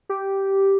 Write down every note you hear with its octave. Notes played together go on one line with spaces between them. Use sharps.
G4